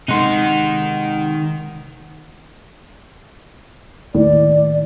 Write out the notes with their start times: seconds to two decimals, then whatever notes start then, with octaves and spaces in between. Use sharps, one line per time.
0.08 C3 D#3 G#3 D#4 F#4 C6
4.15 D#2 A2 D5